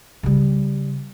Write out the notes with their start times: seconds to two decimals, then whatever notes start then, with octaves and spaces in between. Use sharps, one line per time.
0.23 C#3 G3